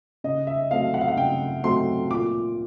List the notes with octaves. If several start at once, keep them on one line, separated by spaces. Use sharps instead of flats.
C#3 D#5
E5
F#3 A3 C4 F5
F#5
F5
F#5
C#3 G5
F#3 A3 C4 C6
A#2 D6